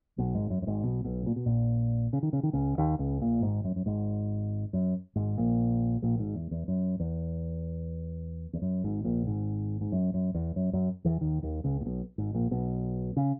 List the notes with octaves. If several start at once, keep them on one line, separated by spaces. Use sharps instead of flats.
B1 B2
G#1 G#2
F#2
F#2
G#1 G#2
B1 B2
B1 B2
A#2
B2
A#1 A#2
C#3
D#3
C#3
D#3
C#2 C#3
D#2 D#3
C#2 C#3
A#1 A#2
G#1 G#2
F#2
F#2
G#1 G#2
F#2
G#1 G#2
A#1 A#2
A#1 A#2
G#1 G#2
E2
E2
F#2
E2
E2
F#2
G#1 G#2
A#1 A#2
G#1 G#2
G#2
F#2
F#2
E2
F#2
F#2
E2 E3
D#2 D#3
D#2 D#3
C#2 C#3
A#2
B1 B2
G#1 G#2
A#1 A#2
B1 B2
C#3